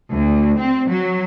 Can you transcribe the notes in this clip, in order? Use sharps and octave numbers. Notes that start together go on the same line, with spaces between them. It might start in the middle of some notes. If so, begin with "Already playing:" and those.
D2
C4
F#3